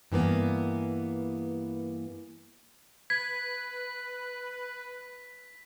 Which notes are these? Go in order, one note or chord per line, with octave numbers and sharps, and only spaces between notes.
G2 E3 A#3 B3
B4 G#6 B6